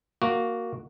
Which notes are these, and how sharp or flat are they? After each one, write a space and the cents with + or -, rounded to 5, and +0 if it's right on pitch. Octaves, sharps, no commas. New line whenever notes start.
A#3 +0 F#4 +0